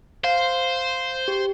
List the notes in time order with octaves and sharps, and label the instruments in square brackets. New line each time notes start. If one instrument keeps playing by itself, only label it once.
[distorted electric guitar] C5 [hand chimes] F5
[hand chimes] G4